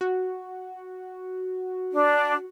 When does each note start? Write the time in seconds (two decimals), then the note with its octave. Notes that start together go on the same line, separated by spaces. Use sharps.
0.01 F#4
1.92 D4